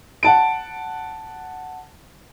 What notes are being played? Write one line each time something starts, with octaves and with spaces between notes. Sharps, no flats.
F#5 A5 D7